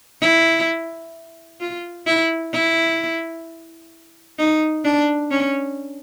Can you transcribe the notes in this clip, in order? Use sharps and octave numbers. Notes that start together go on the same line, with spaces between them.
E4
F4
E4
E4
D#4
D4
C#4